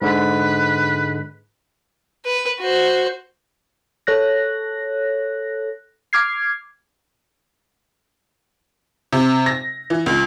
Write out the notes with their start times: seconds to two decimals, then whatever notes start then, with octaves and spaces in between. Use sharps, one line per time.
0.02 G#2 D3 G#3 B4
2.25 B4
2.60 F#4 C5
4.07 A4 C#5 F#6 A#6
6.13 D6 F6 G#6 C7
9.12 C3
9.46 A#6
9.90 E3
10.06 C#2